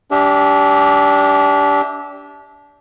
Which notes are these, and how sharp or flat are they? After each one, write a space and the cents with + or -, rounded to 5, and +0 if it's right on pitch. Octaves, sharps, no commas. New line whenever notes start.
D4 -25 G4 +0 E5 -25